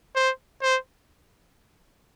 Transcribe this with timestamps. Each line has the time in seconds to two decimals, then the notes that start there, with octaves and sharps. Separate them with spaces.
0.15 C5
0.62 C5